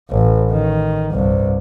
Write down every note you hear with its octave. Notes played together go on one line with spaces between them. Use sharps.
A1
D#3
C2 G2